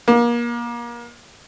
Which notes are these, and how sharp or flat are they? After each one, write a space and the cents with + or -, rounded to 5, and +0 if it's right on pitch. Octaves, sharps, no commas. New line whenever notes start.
A#3 +30